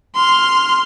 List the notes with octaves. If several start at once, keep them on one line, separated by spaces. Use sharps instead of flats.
C6 F6